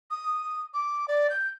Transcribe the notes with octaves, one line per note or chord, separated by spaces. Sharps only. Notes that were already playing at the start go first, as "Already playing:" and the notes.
D#6
D6
D5
G6